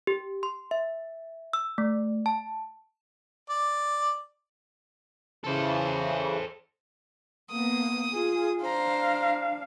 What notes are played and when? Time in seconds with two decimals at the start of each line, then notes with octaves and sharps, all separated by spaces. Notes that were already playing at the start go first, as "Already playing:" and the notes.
0.07 G4
0.43 C6
0.71 E5
1.53 E6
1.78 A3
2.26 A5
3.50 D5
5.44 C#3 E3 A4 C5
7.51 A#3 B3 D#6
8.13 F4 G#4
8.61 D4 C5 F5 A#5